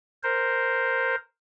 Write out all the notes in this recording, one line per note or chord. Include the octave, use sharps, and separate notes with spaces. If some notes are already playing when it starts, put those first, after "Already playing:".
A#4 C5